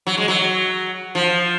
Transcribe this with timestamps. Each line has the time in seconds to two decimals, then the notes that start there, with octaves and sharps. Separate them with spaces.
0.07 F#3
0.18 G#3
0.28 F#3
1.15 F3